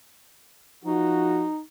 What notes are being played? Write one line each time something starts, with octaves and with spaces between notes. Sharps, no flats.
F3 D#4 F#4